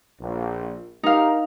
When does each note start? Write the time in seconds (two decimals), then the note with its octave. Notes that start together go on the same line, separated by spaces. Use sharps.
0.20 A#1
1.03 D#4 G4 A#4 F5